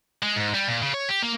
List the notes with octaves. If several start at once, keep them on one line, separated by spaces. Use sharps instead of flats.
G#3
G#2
G3
A#2
C#3
C#5
G4
A#3